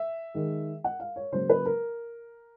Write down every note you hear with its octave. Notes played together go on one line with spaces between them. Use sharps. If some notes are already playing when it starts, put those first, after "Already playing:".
Already playing: E5
D#3 G#3
F#5
F5
C#5
C#3 F#3 A#3 C5
B4
A#4